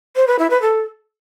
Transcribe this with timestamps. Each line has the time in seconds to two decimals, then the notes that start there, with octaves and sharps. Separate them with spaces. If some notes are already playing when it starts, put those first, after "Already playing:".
0.16 C5
0.27 B4
0.39 E4
0.50 B4
0.62 A4